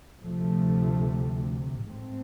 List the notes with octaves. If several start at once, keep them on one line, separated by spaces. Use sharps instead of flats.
D2 C3 F3 A3
A1 G#2 A3 C4